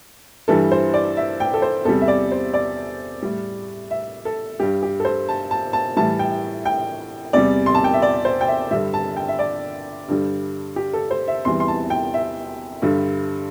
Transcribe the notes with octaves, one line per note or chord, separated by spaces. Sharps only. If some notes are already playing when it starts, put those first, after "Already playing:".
G2 E3 G3 A4
C5
D5
E5
G5
A4
C5
E2 C3 G3 A4
E5
D5
C5
D5
A2 G3
E5
A4
G2 G3 G4
G4
A4
C5
A5
A5
A5
A2 E3 G3 A5
G5
G5
E2 C3 G3 D5
C6
A5
G5
E5
D5
C5
G5
E5
G2 D3 G3 E5
A5
G5
E5
D5
G2 D3 G3
G4
A4
C5
E5
E2 C3 E3 G3 C6
C6
A5
G5
E5
G2 D3 G3